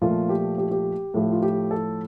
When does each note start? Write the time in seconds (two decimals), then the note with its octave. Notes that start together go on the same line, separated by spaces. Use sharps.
0.01 A#2 F3 A3 F4
0.29 G4
0.58 G4
0.71 G4
1.14 A2 F3 A3
1.32 F4
1.42 G4
1.71 A4